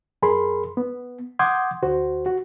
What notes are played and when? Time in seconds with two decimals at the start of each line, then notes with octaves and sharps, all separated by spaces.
0.22 F#2 G#4 A#4 B5 C6
0.77 B3
1.39 F#5 C6 D6 D#6 G6 G#6
1.83 D2 F#4 C5
2.26 F#4